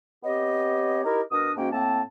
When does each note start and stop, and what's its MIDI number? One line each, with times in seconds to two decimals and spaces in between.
0.23 1.04 59
0.23 1.04 60
0.23 1.04 67
0.23 1.04 73
0.23 1.04 75
1.04 1.21 63
1.04 1.21 64
1.04 1.21 67
1.04 1.21 70
1.31 1.52 47
1.31 1.52 62
1.31 1.52 70
1.31 1.52 87
1.57 1.71 44
1.57 1.71 58
1.57 1.71 61
1.57 1.71 66
1.57 1.71 79
1.72 2.02 45
1.72 2.02 58
1.72 2.02 60
1.72 2.02 81